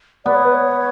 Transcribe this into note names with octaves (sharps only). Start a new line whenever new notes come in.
B3 D5
C#5
B4
C#5